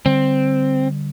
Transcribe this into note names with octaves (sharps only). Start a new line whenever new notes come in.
D3 G3 C4